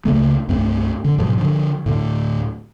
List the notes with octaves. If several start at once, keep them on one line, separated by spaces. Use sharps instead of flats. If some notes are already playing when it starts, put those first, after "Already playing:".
C#2 C#3 A3 A#3
C2 G2 A3 C4
D3
G#2 B2 F3 F#3
D3 F3
D2 A2